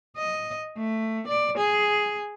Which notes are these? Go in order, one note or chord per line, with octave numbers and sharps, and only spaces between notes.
D#5
A3
D5
G#4